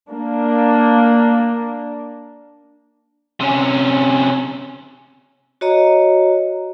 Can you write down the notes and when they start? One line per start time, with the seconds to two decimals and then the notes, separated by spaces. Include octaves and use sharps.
0.11 A#3 D4
3.41 C3 C#4
5.61 F#4 C#5 D#5 A#5